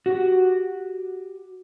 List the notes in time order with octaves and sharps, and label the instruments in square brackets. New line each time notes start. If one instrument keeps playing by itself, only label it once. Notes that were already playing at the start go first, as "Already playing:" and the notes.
[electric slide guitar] F#4 G4